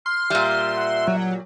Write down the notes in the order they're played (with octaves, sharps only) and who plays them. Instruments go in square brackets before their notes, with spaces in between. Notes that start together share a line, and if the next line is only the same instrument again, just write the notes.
[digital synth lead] C6 [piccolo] F6
[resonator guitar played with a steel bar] A#2 G3 [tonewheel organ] E5
[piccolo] F#5
[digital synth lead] F#3